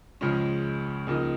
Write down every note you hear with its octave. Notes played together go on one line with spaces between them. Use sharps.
C#2 C#3 F3 G#3 C#4
C#2 C#3 F3 A#3 D#4